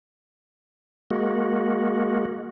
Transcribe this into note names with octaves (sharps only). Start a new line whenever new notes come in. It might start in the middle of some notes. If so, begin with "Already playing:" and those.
G#3 A#3 F#4